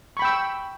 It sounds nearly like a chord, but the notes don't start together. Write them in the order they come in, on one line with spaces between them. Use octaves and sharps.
C#6 B5 G5 E6